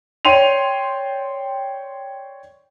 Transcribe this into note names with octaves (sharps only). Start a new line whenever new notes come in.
C#5 D5 G5 C6 D#7 F7